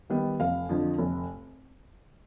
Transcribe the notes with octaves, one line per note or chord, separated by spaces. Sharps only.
D#3 G3 B3
F1 F5
F2 D3 F3
F1